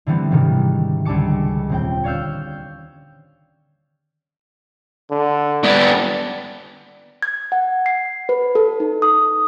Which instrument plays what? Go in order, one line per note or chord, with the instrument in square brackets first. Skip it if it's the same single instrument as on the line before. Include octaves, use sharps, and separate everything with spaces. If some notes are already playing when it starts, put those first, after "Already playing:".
[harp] D3 E3 G3 B3 C4
G#2 C3 D#3 E3 F#3 G3
C#2 D3 G3 A5 D6 C#7
D#1 C4 G5
C#5 D5 F5 E6 G6
[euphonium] D3
[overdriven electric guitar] B3 D4
[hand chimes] G#6
F#5
C7
B4
A4
D#4
D#6